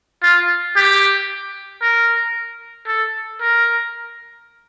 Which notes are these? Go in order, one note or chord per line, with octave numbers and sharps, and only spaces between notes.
F4
G4
A#4
A4
A#4